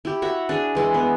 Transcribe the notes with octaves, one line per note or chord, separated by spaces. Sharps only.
E4 G4
F#4 C#5 E5 F#5
D4 G#4
E3 G#3 E4
B3